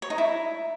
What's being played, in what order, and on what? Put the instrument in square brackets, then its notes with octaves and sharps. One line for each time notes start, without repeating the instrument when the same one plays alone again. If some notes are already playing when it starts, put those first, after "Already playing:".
[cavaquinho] C#5
D#4
E4